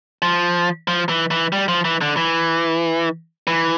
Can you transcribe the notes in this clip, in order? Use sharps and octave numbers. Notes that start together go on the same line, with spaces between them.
F3
F3
E3
E3
G3
F3
E3
D3
E3
E3